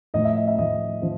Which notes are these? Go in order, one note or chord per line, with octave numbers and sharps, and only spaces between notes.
A2 F3 D#5
E5
D#5
E5
A2 F3 D#5
F3